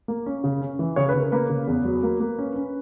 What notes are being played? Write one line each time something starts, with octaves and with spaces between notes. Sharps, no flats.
A#3
C#4
C#3
C#4
E3
C#3 C#5
B4
C#3
A#4
A#3 B4
C#3
E2
F#3
A#3
A#3
C#4
C#4